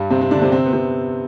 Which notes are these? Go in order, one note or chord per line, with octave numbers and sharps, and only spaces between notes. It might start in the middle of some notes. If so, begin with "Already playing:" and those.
Already playing: G2 G3
C3 C4
C3 C4
D3 D4
C3 C4
C3 C4
B3
C3 C4